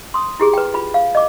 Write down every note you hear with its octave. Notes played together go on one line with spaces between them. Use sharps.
C6 D#6
E4 G4 G#4
B4 G5
F4 B5
F5
D#5 D6